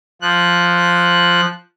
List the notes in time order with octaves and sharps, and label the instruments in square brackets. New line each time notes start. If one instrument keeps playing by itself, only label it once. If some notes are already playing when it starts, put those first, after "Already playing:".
[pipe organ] F3 F#6